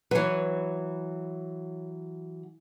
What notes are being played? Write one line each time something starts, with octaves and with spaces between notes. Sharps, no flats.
E3 F#3 B4 C#5